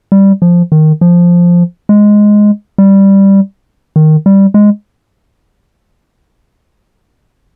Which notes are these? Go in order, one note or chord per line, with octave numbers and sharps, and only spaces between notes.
G3
F3
D#3
F3
G#3
G3
D#3
G3
G#3